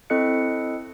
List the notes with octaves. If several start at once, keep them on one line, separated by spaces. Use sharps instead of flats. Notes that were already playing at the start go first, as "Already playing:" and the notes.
C4 E4 A4 D#5 F#6 C#7